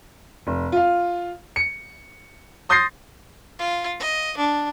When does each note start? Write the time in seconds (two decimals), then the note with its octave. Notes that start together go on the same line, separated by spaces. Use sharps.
0.47 F1
0.72 F4 F5
1.56 C#7
2.69 C6 D#6 G6 A6 A#6 C7
3.59 F4
4.00 D#5
4.37 D4